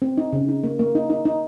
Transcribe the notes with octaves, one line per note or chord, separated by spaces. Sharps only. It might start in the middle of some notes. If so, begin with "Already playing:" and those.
C4
D#4
C#3
D#4
A#3
A#3
D#4
D#4
D#4